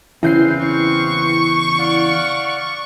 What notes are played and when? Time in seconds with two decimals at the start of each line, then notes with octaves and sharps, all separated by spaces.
0.23 E2 C#3 C4 E4 B4 F5 G6 C7
0.66 C#6
1.79 D5 F5 F#5